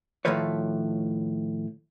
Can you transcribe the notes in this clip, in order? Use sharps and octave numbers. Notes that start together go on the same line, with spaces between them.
A2 D#3 F3 A3 B4 C#5